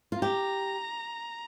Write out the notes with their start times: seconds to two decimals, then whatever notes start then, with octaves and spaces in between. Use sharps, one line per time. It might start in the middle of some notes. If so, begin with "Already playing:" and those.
0.12 F4
0.21 G4 A#5